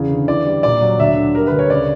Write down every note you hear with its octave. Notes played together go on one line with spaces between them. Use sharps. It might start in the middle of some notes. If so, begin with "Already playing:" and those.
Already playing: E2 C#3
D3
E3 D5
G3
A#2 D5
F#3
D2 E5
D3
G3 A#4
D2 B4
C#5
C#3 D5